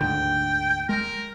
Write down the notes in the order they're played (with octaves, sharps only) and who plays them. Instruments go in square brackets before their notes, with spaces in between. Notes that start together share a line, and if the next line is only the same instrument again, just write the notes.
[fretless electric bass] D2 G#2 D3 [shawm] G5
[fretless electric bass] G#3 [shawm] A#4